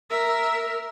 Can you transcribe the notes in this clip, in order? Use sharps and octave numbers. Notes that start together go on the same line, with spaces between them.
A#4 E5